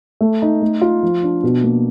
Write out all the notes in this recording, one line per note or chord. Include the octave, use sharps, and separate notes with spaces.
A3
D#4
A3
F4
F3
D4
B2
A#3